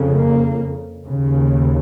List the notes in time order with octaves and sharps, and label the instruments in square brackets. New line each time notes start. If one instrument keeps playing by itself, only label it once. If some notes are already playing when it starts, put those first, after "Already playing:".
Already playing: [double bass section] F2 C#3
A#3
D#2 C#3